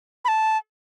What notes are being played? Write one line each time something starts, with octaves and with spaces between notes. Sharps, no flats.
B5
A5